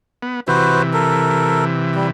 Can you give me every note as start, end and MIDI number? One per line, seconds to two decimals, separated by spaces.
0.23 0.40 59
0.48 2.11 48
0.48 2.11 52
0.48 0.82 66
0.48 0.82 71
0.48 0.82 72
0.93 1.65 69
0.93 1.65 70
1.95 2.07 55